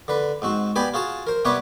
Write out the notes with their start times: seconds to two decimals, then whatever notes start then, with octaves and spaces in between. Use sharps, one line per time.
0.08 D3 B4
0.42 G#2 C4 F#4
0.76 B3 G4 D5 G5 G#5 B5
0.94 F4 F#4 G#4 A5
1.27 A#4 C5
1.45 C3 G3 B3 B4 C#5 D6